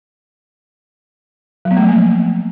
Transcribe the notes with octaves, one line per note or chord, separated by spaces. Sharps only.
F#3
B3
A3
F3
A#3